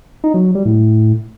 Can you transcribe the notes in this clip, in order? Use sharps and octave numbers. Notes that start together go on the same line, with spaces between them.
D#4
F#3
F#3
G3
A2